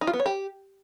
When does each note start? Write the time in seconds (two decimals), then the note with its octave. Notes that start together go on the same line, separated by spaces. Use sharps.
0.01 D#4
0.07 F4
0.13 B3
0.20 C#5
0.26 G4